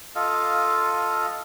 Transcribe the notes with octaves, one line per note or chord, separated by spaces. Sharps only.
F4 A4 D#5 F5